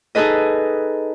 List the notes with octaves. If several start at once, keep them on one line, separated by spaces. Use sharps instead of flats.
D#4 G#4 A4 B4 D#5